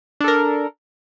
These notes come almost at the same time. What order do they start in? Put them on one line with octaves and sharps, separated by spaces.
D4 A4 A#4